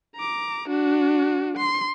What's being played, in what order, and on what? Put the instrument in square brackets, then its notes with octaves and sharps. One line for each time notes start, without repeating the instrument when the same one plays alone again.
[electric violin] A#5 D6
D4 F#4
C6